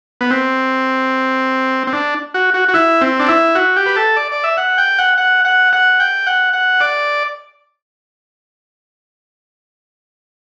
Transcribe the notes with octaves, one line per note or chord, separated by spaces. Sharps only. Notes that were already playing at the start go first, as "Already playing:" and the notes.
B3
C4
C4
D4
F#4
F#4
F#4
E4
C4
D4
E4
F#4
G4
B4
A4
D5
D5
E5
F#5
G5
F#5
F#5
F#5
F#5
G5
F#5
F#5
D5